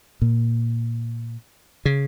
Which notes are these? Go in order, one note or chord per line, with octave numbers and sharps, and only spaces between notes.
A#2
C#3